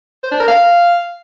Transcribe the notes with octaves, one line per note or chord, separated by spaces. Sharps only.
C5
D4
A#4
F5